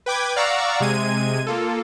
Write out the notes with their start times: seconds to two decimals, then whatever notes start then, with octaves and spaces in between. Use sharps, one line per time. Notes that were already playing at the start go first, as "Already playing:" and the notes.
0.06 B4 G5 D6 G#6
0.36 D5 F5 F#5 A#5 C#6 E6
0.80 C3 G#3 G#6 D#7
1.46 A#3 F4 A4